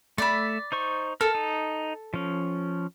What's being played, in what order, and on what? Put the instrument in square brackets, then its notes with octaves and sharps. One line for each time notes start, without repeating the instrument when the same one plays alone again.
[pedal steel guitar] A3 E5 [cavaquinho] D5 B5
[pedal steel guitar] D#4 C5 C#6
[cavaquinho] A4 [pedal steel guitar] A#4
[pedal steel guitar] D#4
F3 C#4